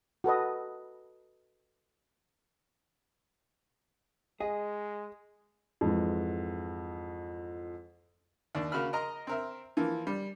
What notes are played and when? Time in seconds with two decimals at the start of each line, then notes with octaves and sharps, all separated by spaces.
0.24 F#4 A4 B4 D#5
4.40 G#3 G#4 D#5
5.81 F2 G#2 E3
8.55 D#2 D4
8.72 C#3 A#3 F#4 B5 F6
8.93 A#4 D#5 A#5 C6
9.27 C4 A#4 E5
9.77 E3 F3 A#3
10.07 G3